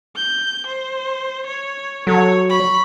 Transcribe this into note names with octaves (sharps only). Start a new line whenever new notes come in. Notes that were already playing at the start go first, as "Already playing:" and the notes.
G6
C5
C#5
F#3 A4 C#5
B5 C#6